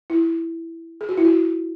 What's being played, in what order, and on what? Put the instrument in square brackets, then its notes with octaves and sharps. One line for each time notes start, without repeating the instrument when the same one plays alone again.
[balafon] E4
G#4
F#4
E4
F#4